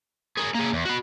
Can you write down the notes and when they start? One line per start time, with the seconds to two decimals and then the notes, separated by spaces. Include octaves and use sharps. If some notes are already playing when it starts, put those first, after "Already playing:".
0.38 G#4 A#4
0.55 A#3 G#4
0.73 E2
0.85 F#4 B5